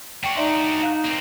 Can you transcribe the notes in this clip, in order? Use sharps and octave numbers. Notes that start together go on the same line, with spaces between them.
D4 F#4 G5 C#6
D#4 D5 E5 C6
F5 F#6
A#3 C4